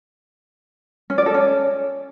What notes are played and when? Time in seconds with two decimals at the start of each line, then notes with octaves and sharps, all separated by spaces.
1.10 C#4
1.18 D5
1.26 A4
1.34 C#4